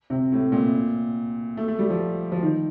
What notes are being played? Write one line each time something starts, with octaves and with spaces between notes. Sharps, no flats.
C3
A2
A#2
A3
A3
G3
F3
F3
D#3